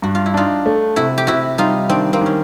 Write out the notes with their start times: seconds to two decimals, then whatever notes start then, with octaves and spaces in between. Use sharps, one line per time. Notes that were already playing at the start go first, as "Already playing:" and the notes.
0.02 G2 F#4
0.15 F4
0.26 E4
0.34 D4 D#4 F4
0.66 A3
0.96 C3 E4 F#4
1.18 G4
1.27 C3 E4 F#4
1.58 G3 D#4 F4
1.89 D#3 C4 D4
2.13 A#3 C4
2.21 D#3 C#4